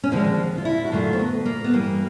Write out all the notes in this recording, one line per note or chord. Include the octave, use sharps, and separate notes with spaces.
C#4
D#2 D3 F3 G#3 C4
F4
E4
F#4
F#2 D3 F#3 A3 F4
C4
B3
A#3
B3
G2 E3 G3 A#3